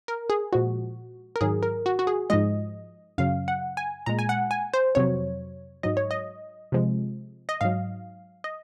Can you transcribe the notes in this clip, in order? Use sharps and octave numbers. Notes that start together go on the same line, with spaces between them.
A#4
G#4
A#2 F3 G#3 F#4
A#4
G#2 D#3 F#3 G#4
A#4
F#4
F#4
G#4
G#2 F3 G#3 D#5
F#2 C#3 F#3 F5
F#5
G#5
A#2 G#3 A#5
G#5
F#5
G#5
C5
F2 C3 F#3 C#5
G#2 F#3 D#5
C#5
D#5
C3 F3 G#3
D#5
G#2 F#3 F5
D#5